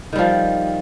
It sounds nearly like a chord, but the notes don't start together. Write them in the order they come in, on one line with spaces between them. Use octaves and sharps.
D#3 G3 F3